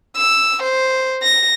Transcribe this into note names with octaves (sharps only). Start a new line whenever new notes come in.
E6
C5
A#6